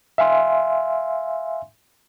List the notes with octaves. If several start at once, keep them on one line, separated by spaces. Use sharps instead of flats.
E5 F5 G#5 C6